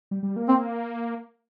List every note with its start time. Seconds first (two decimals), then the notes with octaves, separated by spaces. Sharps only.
0.11 G3
0.23 G3
0.36 A#3
0.48 C4